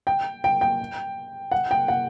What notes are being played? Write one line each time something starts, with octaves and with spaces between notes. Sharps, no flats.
G5
G5
G5
F#5
G5
F#5